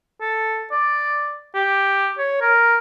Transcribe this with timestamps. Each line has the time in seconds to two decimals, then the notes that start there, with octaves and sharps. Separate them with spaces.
0.21 A4
0.72 D5
1.55 G4
2.18 C#5
2.41 A#4